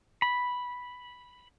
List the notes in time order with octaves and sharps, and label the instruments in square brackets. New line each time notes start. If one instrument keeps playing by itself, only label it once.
[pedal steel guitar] B5